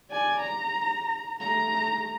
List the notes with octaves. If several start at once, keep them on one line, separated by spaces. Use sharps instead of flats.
D5 G#5
A#5
A3 A#5